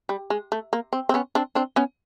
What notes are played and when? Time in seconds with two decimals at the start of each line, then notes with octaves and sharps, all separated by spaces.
0.09 G3
0.30 G#3
0.52 A3
0.73 A#3
0.93 C4
1.09 C4
1.14 B3 C#4
1.35 C4 D4
1.55 C4 D4
1.76 B3 C#4